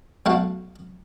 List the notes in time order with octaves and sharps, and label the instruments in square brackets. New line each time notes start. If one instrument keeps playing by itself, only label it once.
[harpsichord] B1 A3 F#4 F5 F#5